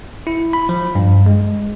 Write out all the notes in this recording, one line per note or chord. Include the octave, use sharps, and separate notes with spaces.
E4
B5
F3
G2
G#3